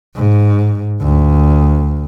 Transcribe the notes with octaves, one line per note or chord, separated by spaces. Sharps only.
G#2
D2